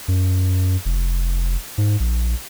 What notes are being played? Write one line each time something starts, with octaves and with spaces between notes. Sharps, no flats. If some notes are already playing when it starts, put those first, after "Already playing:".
F#2
F1
G#2
A#1